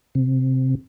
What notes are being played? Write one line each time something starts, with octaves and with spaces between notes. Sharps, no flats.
C3